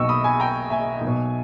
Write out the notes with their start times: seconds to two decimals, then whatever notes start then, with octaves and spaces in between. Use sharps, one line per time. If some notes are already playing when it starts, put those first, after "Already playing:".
Already playing: B1 B2 D#5 G5 C#6 E6
0.09 B5 D#6
0.24 G#5 B5
0.40 G5 A#5
0.70 E5 G#5
1.01 B1
1.07 B2